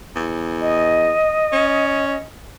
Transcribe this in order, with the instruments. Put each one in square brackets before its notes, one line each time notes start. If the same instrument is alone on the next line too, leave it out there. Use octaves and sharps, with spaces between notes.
[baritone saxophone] E2
[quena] D#5
[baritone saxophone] C#4